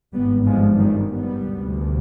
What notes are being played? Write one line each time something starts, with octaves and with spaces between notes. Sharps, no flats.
G#1 G2 G3 B3
F3 G#3
D#3 G3
G3 B3
D2 C3